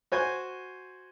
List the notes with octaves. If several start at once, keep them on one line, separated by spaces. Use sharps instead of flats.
F#4 C5 G#5